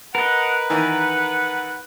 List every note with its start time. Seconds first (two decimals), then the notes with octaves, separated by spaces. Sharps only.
0.15 A#4 B4 D#5 F#5
0.70 D#3 E3 D#4 F#5